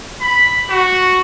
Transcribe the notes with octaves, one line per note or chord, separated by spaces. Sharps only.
B5
F#4